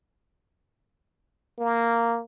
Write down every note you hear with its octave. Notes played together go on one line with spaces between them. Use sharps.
A#3